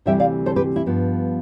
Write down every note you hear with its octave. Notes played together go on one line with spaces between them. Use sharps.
D2 C3 E3 G3 C4 E5 G5
D5 F5
A4 C5
G4 B4
E4
G2 F3 B3